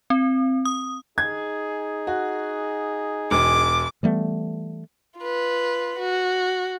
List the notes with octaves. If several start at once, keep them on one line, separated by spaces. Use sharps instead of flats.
C4
D#6
D#4 G#4 G#6
F#4
E1 D6
E3 G3 A3 B3
F4 B4
F#4